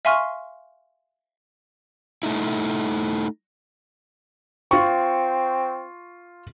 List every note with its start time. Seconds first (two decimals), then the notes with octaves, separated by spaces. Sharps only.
0.05 E5 F5 G#5 C6 C#6 F6
2.23 A3 D#4 E4
4.71 C4 F4 C#6